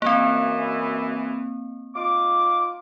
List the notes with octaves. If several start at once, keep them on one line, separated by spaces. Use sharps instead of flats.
F#2 E3 A#3 C4
D#4 F4 D6